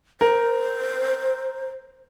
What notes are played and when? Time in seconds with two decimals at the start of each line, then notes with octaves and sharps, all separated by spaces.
0.21 A#4 C5